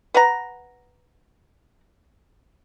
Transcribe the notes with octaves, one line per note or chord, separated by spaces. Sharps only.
B4 F#5 A#5